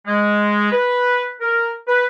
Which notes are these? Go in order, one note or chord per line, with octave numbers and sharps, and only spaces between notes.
G#3
B4
A#4
B4